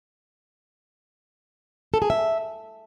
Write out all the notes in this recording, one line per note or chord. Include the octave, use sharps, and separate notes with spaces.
A4
G#4
E5